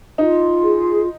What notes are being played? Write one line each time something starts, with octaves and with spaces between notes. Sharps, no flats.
D#4 F4
G#4